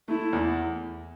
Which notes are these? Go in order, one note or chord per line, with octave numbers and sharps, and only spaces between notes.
A3 E4
E2